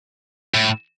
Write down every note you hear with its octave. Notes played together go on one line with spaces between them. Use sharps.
A2